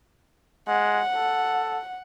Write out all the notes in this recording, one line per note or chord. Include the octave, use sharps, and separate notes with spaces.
G#3 F#5
A4